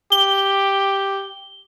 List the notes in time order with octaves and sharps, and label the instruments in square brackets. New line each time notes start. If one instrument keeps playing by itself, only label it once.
[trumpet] G4 [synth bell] G7